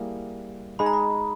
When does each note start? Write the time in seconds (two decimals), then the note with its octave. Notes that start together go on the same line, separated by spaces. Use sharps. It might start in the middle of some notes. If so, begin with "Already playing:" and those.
Already playing: G3 A#3 E4 G#4
0.79 G#3 D#4 G#4 B5
0.86 A#5
0.93 B5